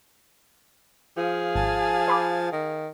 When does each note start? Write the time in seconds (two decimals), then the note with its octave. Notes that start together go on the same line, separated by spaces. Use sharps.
1.17 F3 G#4 F5
1.55 G#1 G#5 A5
2.08 C5 B5 D6
2.53 D#3